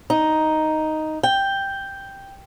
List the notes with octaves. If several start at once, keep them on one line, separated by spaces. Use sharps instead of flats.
D#4
G5